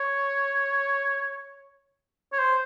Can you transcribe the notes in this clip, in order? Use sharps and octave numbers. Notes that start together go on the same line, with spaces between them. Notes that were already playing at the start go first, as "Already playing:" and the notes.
Already playing: C#5
C#5
C5